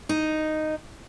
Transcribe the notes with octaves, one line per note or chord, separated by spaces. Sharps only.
D#4